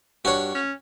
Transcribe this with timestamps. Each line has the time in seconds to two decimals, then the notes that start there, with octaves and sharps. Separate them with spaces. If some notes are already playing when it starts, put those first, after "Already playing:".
0.25 G2 F#4 C#5
0.55 C#4